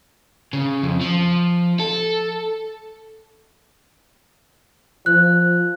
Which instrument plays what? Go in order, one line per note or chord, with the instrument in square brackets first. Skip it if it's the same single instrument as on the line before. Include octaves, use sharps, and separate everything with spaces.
[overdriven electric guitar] C#3
F2
F3
A4
[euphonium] F3 [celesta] F#6